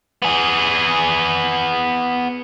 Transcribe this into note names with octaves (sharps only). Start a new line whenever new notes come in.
B3 G#4